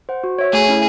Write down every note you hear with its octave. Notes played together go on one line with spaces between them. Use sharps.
C5 F#5
F#4
C#5 E5
A3 G#4
C#4 E4